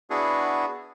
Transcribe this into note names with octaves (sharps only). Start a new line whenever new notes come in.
B3 D4 E4 F#4 G#4